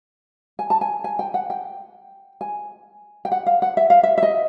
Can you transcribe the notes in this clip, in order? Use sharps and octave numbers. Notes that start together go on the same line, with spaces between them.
G#5
A5
G#5
G#5
G5
F#5
G5
G#5
G5
F#5
F5
F#5
E5
F5
E5
E5
D#5